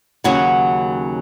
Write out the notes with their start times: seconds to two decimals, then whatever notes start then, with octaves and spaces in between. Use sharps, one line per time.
0.24 D#2 C#3 F#3 C#4 F#4